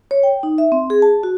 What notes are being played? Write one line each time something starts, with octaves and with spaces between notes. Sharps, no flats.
C#5
G5
D#4
E5
C4
G#4
A5
F#4